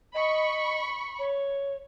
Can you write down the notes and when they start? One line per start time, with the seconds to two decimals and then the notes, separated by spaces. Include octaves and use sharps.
0.14 D#5 B5 C#6
1.19 C#5